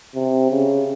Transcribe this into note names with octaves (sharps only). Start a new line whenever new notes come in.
C3
C#3